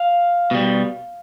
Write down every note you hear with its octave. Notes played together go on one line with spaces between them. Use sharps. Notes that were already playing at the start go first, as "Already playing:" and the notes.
Already playing: F5
B2 G3